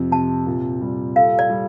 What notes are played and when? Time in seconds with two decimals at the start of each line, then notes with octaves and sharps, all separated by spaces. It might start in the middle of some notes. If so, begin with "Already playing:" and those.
Already playing: F2 C3
0.11 C3 A5
0.46 A#2
0.82 G3
1.16 A4 F5
1.39 D5
1.50 G3